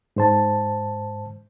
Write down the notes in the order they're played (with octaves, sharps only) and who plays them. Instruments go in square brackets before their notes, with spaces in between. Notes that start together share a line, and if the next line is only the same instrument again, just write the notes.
[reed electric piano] G#2 C5 A5